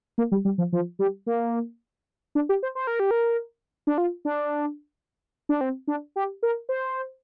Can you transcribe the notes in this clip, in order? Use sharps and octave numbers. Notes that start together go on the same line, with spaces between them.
A#3
G3
G3
F3
F3
G3
A#3
D4
G4
C5
C5
A#4
G4
A#4
D4
F4
D4
D4
C4
D4
G4
A#4
C5